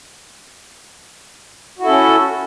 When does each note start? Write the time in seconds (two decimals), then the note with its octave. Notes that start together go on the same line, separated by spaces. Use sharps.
1.79 F#4
1.82 E4
1.85 A4
1.88 C#4